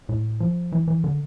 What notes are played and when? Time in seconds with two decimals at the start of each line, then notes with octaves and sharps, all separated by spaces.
0.09 A2
0.40 F3
0.72 E3
0.88 E3
1.04 D3